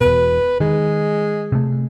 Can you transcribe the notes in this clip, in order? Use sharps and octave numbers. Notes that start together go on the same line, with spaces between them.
E1 B2 B4
D#3 G#3
C3 A3